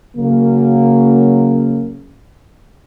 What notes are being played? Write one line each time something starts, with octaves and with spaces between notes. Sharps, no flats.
C#3 F#3 A#3